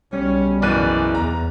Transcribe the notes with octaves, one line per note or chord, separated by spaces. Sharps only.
B1 C#3 G3 C#4
F#1 E3 D5 F#6 D#7
E2 A#5